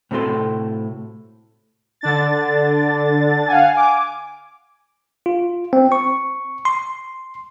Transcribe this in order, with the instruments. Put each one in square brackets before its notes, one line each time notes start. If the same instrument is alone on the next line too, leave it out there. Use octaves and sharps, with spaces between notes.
[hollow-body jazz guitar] A2 C3 C4 F#4 A4 C6
[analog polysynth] D3 D4 A6
F5 F#5 G#5
G#5 D6
[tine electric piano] F4
C4
C#6
C6